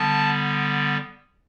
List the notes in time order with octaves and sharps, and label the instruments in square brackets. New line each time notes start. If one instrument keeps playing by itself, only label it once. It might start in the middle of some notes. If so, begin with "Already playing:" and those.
Already playing: [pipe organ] D3 G3 B3 A5